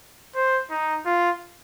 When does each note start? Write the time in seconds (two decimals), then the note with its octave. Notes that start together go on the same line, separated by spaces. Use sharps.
0.35 C5
0.70 D#4
1.06 F4